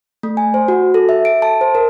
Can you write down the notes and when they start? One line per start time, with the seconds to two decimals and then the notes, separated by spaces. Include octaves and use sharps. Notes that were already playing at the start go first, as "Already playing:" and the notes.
0.23 A3
0.37 G#5
0.54 C5
0.68 F#4
0.94 A4
1.09 E5
1.25 D7
1.42 A5
1.61 C5
1.75 A#4